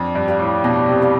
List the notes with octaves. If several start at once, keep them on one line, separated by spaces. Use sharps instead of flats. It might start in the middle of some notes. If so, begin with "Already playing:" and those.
Already playing: F2 D4
G2
G4 D5 F5
A2
B2 D4
C3
G4 D5 F5